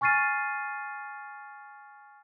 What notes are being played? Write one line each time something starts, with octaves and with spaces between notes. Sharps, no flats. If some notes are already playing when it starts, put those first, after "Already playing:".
G#5 C#6 F6 A6 C7 D#7